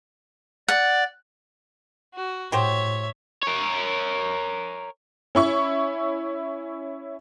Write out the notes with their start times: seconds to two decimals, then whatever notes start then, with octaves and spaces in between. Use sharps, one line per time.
0.68 D5 F#5
2.14 F#4
2.52 A2 F#3 G4 C5 C#5 E5
3.43 A#4 C#5
5.35 C#4 E4 C#6